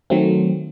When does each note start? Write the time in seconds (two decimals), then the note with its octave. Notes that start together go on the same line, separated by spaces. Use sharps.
0.10 D#3 F#3 A3 C4